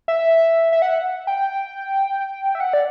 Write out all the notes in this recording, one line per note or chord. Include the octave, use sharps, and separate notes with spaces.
E5
E5
F#5
G5
E5
F#5
D5